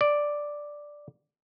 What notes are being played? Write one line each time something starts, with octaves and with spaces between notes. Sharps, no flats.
D5